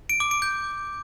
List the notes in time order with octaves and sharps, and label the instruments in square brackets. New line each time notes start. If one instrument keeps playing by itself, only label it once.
[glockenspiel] D7
D6
D7
G6